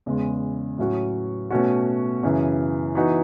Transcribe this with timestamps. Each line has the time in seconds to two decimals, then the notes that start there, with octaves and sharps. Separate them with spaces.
0.06 E2 C#3 G#3
0.78 A2 F#3 C#4 F#4
1.50 B2 A3 C#4 F#4
2.23 F#2 C#3 E3
2.95 E3 B3 D#4 F#4